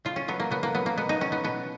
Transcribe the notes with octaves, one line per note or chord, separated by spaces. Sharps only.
C#3 F4
C#4
F#3 B3
A#3
C#3 B3
A#3
F#3 B3
A#3
B2 B3
D#4
F#3 C#4
B3
B2 B3